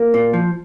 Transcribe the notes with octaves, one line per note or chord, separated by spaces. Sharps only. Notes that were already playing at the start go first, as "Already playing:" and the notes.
Already playing: A#3
A#2
F3